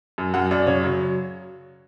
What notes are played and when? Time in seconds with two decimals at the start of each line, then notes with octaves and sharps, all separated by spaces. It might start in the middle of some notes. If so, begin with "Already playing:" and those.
0.18 F#2
0.34 F#2 F#5
0.51 F#2 D5
0.67 C#3 C#5
0.84 F#3